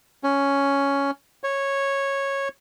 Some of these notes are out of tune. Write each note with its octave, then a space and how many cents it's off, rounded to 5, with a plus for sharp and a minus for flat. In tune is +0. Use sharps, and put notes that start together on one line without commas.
C#4 +5
C#5 -10